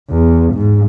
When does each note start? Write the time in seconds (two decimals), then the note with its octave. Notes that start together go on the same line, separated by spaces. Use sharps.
0.10 E2
0.54 G#2